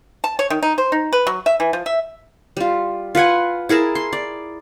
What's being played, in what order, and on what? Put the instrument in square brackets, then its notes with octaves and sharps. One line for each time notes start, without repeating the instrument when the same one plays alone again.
[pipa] A5
C#5
D#3
D#4
C5
D#4
B4
F#3
E5
E3
F3
E5
[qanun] G3 F4
F4 B4 F#5 G#5
E4 G#4 A#4 A5
C6
D5